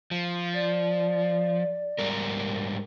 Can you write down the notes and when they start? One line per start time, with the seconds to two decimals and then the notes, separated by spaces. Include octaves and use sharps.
0.11 F3
0.54 D5
1.99 G#2 G3 A#4